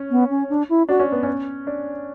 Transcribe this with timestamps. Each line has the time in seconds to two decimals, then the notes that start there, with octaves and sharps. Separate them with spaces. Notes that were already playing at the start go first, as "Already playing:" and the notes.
Already playing: C#4
0.11 B3
0.30 C#4
0.50 D4
0.69 E4
0.89 D4 F#4
1.00 C#4
1.12 B3
1.23 C#4
1.67 D4